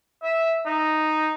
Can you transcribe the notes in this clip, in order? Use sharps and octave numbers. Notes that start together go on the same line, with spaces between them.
E5
D#4